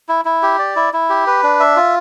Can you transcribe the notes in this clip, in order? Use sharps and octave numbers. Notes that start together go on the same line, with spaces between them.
E4
E4
G4
D5
E4
E4
G4
B4
D4
E5
F4